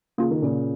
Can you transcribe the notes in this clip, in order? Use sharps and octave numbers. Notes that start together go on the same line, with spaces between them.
C#3 A#3 F4 G#4
D#3
A#2 C#3